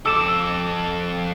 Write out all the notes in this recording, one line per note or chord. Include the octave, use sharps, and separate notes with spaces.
F2 A4 D6 E6 E7